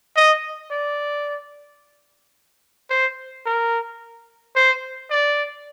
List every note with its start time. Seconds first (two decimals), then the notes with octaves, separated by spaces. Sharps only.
0.16 D#5
0.71 D5
2.90 C5
3.46 A#4
4.56 C5
5.10 D5